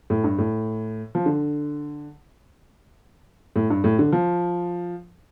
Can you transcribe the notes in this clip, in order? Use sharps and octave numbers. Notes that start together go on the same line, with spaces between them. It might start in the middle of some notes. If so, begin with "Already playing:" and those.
A2
G2
A2
F3
D3
A2
G2
A2
D3
F3